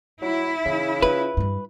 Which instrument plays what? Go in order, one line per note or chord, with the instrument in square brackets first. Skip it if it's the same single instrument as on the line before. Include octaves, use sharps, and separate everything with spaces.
[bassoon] F#3 [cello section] E4
[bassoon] C#3 [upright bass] E3
[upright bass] C#4 F4 [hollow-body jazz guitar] B4
[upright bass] G2 G3